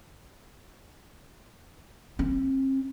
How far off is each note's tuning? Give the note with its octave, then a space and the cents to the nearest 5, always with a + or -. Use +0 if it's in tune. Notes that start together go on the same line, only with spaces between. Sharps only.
C4 +40